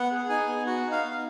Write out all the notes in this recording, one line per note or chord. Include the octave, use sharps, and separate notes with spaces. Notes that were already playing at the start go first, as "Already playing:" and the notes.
Already playing: B3 F#5
G#4
D#4 G#5
B3
F#4 F#5
D#4
F5
B3